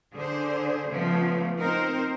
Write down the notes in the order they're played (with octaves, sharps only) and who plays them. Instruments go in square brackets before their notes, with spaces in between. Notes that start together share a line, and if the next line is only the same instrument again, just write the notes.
[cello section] D3 G#4 C5
C#3 F3 A3 B3
C4 D#4 A#4 C5